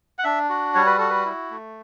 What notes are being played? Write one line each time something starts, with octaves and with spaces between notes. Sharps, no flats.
F#5
D4 E5
F#4
G3 C#5
B4
F#4 A4
B4
E4
A3